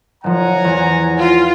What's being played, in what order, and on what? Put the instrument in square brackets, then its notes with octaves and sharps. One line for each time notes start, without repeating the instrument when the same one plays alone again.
[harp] F#1 F3 [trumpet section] F#5 G#5 A#5
[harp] E2
[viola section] F4